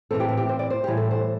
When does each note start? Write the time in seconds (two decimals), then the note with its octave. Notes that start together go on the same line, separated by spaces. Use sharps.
0.11 A2 E3 C4 A4
0.20 G4
0.29 E4
0.37 G4
0.49 C5
0.59 D5
0.70 C5
0.84 A2 E3 G3 G4
0.97 A4
1.11 C5